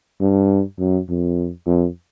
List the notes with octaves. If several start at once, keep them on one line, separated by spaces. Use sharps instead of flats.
G2
F#2
F2
F2